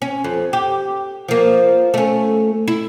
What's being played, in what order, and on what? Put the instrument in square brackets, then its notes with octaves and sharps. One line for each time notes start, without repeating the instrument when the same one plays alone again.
[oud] C#4
F2
G4
F3 A#3
A3 C#4
E4